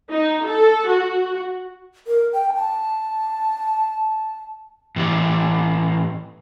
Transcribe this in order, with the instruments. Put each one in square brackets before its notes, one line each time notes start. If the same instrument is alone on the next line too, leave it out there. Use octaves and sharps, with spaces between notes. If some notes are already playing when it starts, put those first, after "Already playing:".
[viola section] D#4
A4
F#4
[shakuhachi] A#4
G5
A5
[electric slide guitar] A2 E3 G4